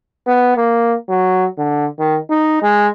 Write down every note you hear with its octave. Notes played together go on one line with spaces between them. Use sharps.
B3
A#3
F#3
D3
D#3
D#4
G#3